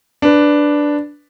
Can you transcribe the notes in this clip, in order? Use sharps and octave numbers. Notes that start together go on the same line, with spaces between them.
D4 B4